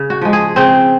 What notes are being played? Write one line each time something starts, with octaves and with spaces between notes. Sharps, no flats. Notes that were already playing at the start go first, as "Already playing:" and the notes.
Already playing: C#3
F#4
F3 G#3
G#4
C#3 C4